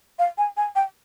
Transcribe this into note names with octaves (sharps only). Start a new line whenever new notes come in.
F5
G#5
G#5
G5